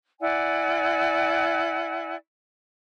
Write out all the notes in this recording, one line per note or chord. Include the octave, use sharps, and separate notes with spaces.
E4 D5 F#5 G#5